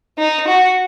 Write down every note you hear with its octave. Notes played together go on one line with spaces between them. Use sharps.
D#4
F#4